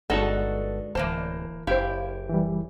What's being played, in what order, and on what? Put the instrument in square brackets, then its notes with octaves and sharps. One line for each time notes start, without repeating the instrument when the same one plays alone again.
[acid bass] G1 [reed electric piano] G#3 [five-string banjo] D4 D#4 F#4 [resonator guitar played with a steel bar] A4 D#5 F#5
[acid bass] D1 [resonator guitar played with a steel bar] E3 A#3 A5 [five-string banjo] C5
[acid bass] F#1 [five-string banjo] E4 C5 [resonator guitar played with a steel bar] G4 [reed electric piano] F5
[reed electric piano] E3 G3